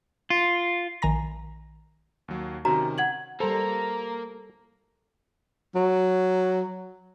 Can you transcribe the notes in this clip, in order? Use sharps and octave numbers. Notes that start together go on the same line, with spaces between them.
F4
A#1 D#3 G#5 A#5 A#6
D#2 F#3
C3 D#3 C#4 F#4 A#5
F#5 G#6 F#7
G3 A#3 A4 C5 A#5
F#3